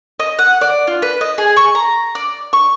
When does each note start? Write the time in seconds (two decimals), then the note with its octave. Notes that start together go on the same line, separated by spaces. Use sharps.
0.20 D#5
0.39 F#5
0.61 D5
0.87 F4
1.02 B4
1.21 D#5
1.38 G#4
1.56 C#6
1.75 A#5
2.15 D5
2.53 C#6